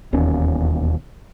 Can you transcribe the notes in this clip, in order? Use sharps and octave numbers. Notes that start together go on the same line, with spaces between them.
E1 D#2 C#4